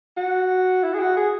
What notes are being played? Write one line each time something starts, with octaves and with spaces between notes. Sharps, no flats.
F#4
E4
G#4
F#4
G#4